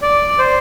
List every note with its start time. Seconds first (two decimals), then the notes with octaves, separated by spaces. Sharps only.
0.02 D5
0.39 C5